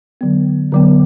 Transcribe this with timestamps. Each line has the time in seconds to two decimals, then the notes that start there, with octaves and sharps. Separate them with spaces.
0.21 D3 F#3 B3
0.72 D3 F#3 B3